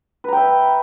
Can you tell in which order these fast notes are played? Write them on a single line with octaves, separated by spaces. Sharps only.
B4 A#5 G5 E5